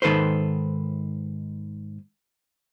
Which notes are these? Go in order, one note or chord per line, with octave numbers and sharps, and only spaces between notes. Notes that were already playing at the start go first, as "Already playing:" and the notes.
G#2 D#3 A4 B4 C5